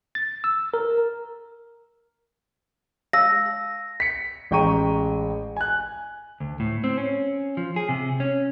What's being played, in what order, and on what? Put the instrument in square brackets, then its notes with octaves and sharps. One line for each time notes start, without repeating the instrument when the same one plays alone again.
[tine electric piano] A6
E6
A#4
[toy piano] F5 A5 E6 [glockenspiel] A#6
[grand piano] B6 C#7
A1 G#3 G5 A#5 C#6 D#7
G#5 F#6
[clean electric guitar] D2
A2
C4
C#4
F3
G#4
C3
C#4